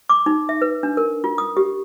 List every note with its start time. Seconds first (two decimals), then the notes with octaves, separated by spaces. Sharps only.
0.09 D6
0.26 D#4
0.49 E5
0.61 B4
0.83 D4
0.97 A#4
1.24 F4
1.38 D#6
1.57 G4